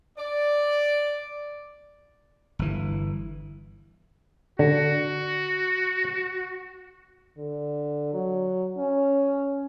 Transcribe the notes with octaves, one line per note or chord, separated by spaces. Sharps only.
D5
G1 E3
D3 F#4
D3
F#3
C#4